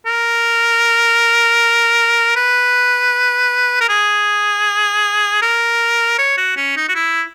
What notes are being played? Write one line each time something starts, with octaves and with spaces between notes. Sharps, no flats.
A#4
B4
A#4
G#4
A#4
C#5
F#4
C#4
D#4
F#4
E4